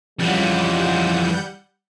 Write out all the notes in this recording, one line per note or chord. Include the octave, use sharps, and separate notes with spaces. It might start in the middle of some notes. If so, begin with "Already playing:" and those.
F2 C#3 E3 G3 G#3 F4 F#5 G6